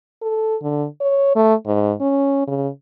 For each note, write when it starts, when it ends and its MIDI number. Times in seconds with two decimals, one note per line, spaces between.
0.22 0.56 69
0.62 0.86 50
1.00 1.35 73
1.35 1.54 57
1.66 1.93 44
2.01 2.44 61
2.47 2.69 49